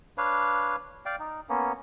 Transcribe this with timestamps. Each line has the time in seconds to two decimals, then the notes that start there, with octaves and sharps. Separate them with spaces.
0.18 D4 B4 C#5 F5
1.06 D5 F5 G5
1.20 D#4
1.49 A#3 B3 C#4